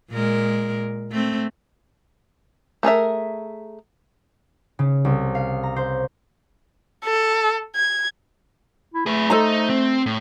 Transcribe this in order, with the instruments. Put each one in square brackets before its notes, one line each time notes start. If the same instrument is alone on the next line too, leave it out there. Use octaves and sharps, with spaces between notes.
[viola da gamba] A#2 G#3 A#4
A3 C4
[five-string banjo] A3 G#4 A#4 E5
[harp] C#3
C2
F5
A#5
C5
[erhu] A4
G#6
[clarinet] E4
[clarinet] A3 [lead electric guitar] G#4 B4
[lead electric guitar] D#4 [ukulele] A4 C5 A#5
[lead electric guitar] C4
A2